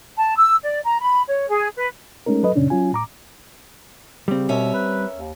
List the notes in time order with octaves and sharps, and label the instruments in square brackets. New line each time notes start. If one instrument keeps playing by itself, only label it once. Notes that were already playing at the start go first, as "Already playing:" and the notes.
[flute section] A5
E6
D5
A#5
B5
C#5
G#4
B4
[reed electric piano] G#3 A3 C#4 D#4 A#4
F#3 A4 B4 D#5
F#2 A#2 C#3 C#4 D4
F#3 C#4 F4 G#5
A2 A#5 D6
[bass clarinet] C#3 [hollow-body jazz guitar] G3 C4
[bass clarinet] B2 [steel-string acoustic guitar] C#4 A#4 E5
[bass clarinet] B4
D#2